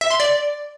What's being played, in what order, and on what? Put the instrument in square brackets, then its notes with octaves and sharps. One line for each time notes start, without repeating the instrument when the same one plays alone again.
[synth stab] E5
C6
D5